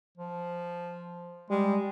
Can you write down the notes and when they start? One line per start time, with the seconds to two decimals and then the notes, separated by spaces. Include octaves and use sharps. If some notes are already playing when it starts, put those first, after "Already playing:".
0.17 F3
1.50 G3 G#3